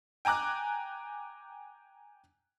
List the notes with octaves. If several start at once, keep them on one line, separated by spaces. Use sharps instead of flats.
G5 G#5 A#5 D6 F#6